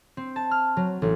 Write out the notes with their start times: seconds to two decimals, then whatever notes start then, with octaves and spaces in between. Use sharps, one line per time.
0.17 C4
0.36 A5
0.51 F6
0.77 F#3
1.02 A1